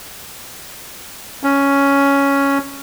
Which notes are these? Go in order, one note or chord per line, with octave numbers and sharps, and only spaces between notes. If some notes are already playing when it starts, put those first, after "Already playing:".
C#4